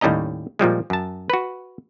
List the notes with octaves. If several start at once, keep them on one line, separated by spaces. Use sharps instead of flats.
D#2 A2 G3 C#4 D#5 A#5
A#2 F3 G3 G#3
F#2 A5
F#4 B4